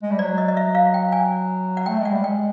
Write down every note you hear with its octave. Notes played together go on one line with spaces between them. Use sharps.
G#3
G3
F#3 D5
D#5
D#5
E5
F5
G5
G#5
F#5
A3 G5
G#3
F#5
G3
G#3 G5